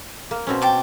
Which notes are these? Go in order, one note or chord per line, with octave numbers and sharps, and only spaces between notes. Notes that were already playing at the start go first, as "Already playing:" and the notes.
A#3
B2 C4 C#4
G5 A5 D6